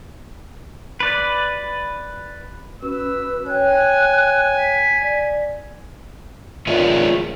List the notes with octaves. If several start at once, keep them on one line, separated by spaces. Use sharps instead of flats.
B4 D5
C#4 F#4 B4 E6
C#5 G5 G#5 F#6
B6
D5
F4 G#4 A#4 C#5 D5 E5